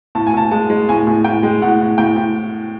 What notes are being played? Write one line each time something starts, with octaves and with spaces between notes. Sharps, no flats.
A2 A5
G#5
A2 A5
G#3 A5
G#3
A2 G#5
A2
A2 G5
G#3
A2 F#5
A2
A2 G5
A2